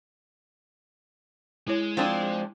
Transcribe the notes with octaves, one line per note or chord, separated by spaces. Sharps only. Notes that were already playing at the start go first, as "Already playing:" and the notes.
G#3 E4 C#5
F3 C4 D4